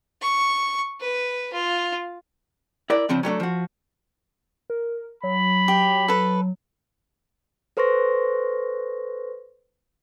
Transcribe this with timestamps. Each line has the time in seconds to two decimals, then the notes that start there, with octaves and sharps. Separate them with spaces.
0.21 C#6
1.00 B4
1.52 F4
2.90 E4 A#4 D5
3.09 C#3 F3 C4 D4
3.23 F#3 G3 A3 D4
3.40 F3 F#4
4.70 A#4
5.24 F#3 B5
5.68 G4
6.08 A4 B4
7.77 A4 B4 C5 C6 C#6 A#6